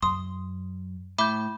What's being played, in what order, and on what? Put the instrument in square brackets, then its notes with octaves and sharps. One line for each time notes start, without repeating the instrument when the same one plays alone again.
[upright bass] F#2 [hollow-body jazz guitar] C6 [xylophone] D#6
[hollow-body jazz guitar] A2 [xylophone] E5 D6 G7 [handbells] B5 G6